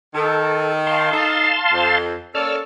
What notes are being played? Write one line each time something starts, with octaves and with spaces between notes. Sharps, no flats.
D#3 A4
F5 A5 C6
D#4 A4
F2
A#3 C#4 A4 D5 E6 F6